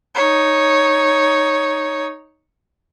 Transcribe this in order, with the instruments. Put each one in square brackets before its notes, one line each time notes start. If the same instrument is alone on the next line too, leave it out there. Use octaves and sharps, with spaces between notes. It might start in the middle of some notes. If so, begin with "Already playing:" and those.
[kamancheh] D#4 C#5